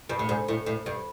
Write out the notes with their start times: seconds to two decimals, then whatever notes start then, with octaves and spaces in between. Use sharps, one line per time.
0.09 G2
0.19 A2
0.29 G#2
0.48 A2
0.66 A2
0.86 G2